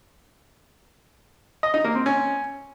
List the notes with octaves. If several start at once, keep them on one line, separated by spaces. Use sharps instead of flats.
D#5
D#4
A#3
C4
C#4